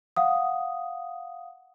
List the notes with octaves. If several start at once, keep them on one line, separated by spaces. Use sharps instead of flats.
F5 F#5 D#6